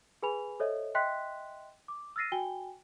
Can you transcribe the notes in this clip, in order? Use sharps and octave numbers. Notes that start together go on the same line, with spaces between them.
G#4 B4 G#5 B5 F7
A4 C5 C#5 D#5 E5
D#5 E5 G5 C6 F#6 B6
D6
E6 F6 A6 A#6 C7 D#7
F#4 G5 G#5 G7